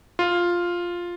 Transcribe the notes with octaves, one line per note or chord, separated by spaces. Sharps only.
F4